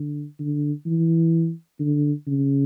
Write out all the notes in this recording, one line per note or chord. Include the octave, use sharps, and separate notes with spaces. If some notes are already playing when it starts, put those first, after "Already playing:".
Already playing: D3
D3
E3
D3
C#3